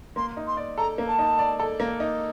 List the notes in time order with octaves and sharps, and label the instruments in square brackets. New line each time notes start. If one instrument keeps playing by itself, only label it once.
[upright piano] A#3 [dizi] C6
[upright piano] D#4
[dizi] C6
[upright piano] D5
[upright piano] A4 [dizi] A#5
[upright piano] A#3
[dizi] A5
[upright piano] D#4
D5
A4
A#3
D#4